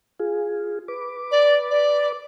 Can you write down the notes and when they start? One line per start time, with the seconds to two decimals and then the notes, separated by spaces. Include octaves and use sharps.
0.19 F4 G#4
0.88 B4 D6
1.32 D5
1.71 D5